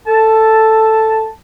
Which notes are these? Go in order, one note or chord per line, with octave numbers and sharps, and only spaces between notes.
A4 A5